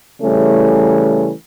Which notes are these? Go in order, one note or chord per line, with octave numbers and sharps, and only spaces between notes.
C#3 E3 G3 A3 C#4